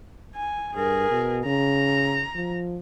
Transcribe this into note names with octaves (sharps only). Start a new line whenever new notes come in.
G#5
G2 G#4 A#4
B2
C#3 A#5
F3